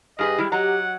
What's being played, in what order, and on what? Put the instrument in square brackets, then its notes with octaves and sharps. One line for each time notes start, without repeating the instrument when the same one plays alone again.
[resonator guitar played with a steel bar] G2 G#4 B4 [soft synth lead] G4 [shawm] D#5
[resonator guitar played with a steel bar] G3 G#3 E4
[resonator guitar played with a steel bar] F#3 D#5 A#5 [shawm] F#5